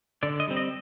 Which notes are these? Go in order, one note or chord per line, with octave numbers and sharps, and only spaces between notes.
D3 D5
D#5
G3 C4
D#5